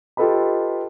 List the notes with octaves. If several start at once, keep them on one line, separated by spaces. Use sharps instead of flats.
F4 G4 A4 B4 D#5 B5